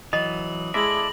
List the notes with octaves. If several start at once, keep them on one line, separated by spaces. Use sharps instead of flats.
E3 F#3 D#5 D#6
G#3 E4 A4 D5 E5 A#6 F#7